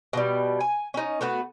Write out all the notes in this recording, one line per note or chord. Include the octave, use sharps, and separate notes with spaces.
B2 F3 G3
G#5
C#4 D#4
A3 B3 F#4 B4